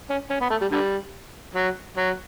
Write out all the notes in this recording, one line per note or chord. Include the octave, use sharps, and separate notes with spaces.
C#4
C#4
B3
A3
G3
D3 G3
F#3
F#3